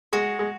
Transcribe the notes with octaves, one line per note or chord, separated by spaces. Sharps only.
G#3 F#4
G#3